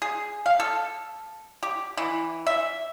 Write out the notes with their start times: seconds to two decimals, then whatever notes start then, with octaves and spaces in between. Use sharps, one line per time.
0.02 G#4
0.46 F5
0.60 A4
1.63 G4
1.97 E3
2.47 E5